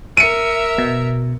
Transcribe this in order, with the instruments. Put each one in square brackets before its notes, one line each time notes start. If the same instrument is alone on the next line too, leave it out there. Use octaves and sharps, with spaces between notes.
[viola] A#4 E5 [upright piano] C#7 D#7
[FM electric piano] B2